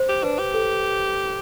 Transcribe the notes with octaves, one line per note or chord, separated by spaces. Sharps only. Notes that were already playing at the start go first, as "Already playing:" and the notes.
Already playing: C5
G4
D4 B4
G4
A4